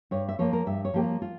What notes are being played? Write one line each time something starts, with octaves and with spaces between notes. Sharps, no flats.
G2 C#5
E5
F3 A#3 C#5
A#4
G2 E5
C#5
F3 A#3 G4
F4
F4